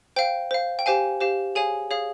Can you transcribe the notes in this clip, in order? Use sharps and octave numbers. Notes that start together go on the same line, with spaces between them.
C5 F5 G5
C5 F5
G5
G4 C5 F5 G#5
G4 C5 F5
G#4 C#5 F5 G#5
G#4 C#5 F5